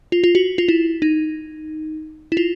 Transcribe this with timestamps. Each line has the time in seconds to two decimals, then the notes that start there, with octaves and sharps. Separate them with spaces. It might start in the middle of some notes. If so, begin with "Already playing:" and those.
0.12 F4
0.24 F4
0.35 F#4
0.58 F4
0.68 E4
1.02 D#4
2.32 E4
2.37 F4